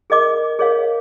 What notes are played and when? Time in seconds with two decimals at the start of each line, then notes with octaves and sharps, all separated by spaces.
0.10 G#4 A#4 D#5 D6
0.59 G#4 A#4 C#5 D#5 F5